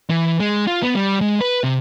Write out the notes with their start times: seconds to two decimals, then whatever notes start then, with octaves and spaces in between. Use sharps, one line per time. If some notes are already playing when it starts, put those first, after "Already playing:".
0.10 E3
0.40 G#3
0.67 F4
0.83 B3
0.95 G3
1.21 G#3
1.41 B4
1.64 C3